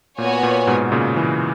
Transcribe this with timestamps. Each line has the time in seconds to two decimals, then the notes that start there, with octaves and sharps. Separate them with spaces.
0.18 A#2 B3 F#4 C#5 G#5
0.43 A#2
0.67 G#2 B2
0.92 A#2 C#3
1.17 C#3 E3